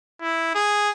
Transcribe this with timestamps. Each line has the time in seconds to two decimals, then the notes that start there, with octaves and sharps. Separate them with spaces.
0.22 E4
0.55 G#4